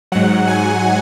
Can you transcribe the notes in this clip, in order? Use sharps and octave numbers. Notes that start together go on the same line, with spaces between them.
G#2 F#3 F#5
G#5